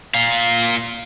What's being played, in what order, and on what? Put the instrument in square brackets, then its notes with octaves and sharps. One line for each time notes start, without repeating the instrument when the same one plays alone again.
[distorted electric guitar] A#2 F5